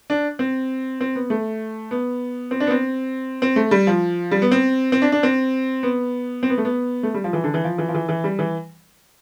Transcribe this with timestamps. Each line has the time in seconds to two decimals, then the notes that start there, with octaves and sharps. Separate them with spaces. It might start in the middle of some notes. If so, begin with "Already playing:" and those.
0.10 D4
0.39 C4
1.01 C4
1.16 B3
1.30 A3
1.91 B3
2.51 C4
2.60 D4
2.67 B3
2.70 C4
3.42 C4
3.56 A3
3.71 G3
3.87 F3
4.31 G3
4.42 B3
4.52 C4
4.92 C4
5.02 D4
5.12 D4
5.23 C4
5.83 B3
6.43 C4
6.50 B3
6.58 A3
6.65 B3
7.03 A3
7.14 G3
7.24 F3
7.33 E3
7.44 D3
7.54 E3
7.64 F3
7.78 E3
7.89 F3
7.95 E3
8.09 E3
8.24 G3
8.39 E3